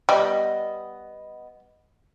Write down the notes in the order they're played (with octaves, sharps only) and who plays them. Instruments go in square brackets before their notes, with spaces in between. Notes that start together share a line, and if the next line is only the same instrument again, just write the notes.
[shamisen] G3 [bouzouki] B3 D#5